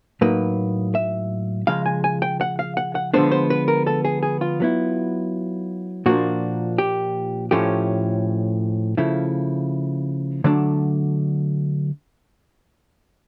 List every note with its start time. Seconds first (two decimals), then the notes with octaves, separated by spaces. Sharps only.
0.21 A2 F#3 A#3 D#4 B4
0.95 E5
1.67 C#3 F3 G#3 F5
1.86 G#5
2.04 G#5
2.22 G5
2.41 F#5
2.59 F5
2.77 F#5
2.95 F#5
3.14 D3 F3 G#3 B3 D4 C5
3.31 C5
3.50 B4
3.68 A#4
3.87 A4
4.05 G#4
4.23 G#4
4.41 F4
4.60 F#3 B3 E4
6.06 A#2 F3 A#3 D4 F#4
6.78 G4
7.51 A2 F3 A3 C#4 G4
8.97 C#3 F3 A3 E4
10.44 D3 F#3 A3 D4